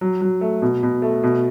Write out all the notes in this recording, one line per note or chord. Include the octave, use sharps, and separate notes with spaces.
F#3
F#3
A3
B2
B2
A3
B2